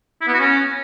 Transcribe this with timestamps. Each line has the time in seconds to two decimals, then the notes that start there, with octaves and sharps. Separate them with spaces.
0.21 E4
0.27 B3
0.33 F#4
0.40 C#4